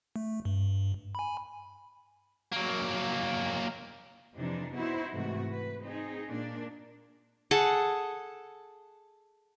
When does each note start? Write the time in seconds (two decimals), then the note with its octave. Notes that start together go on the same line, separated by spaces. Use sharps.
0.16 A3
0.45 G2
1.15 G#5 B5
2.52 F#3 A#3
4.35 F2 C3 E3 D4 D#4
4.75 B3 D#4 E4 F#4 C5
5.14 G#2 C3 E3 A3 F#4
5.51 B4
5.83 C4 D#4 G#4
6.31 A#2 A#3 D4
7.51 G#4 A4 F#5 A5